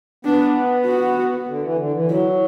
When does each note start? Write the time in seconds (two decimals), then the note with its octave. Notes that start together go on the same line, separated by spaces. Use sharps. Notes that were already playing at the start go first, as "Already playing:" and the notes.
0.25 B3 D4
0.86 F#4
1.47 D3
1.63 E3
1.78 D3
1.93 E3
2.09 F#3 E4